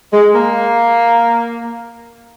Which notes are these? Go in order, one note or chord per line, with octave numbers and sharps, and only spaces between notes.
G#3
A#3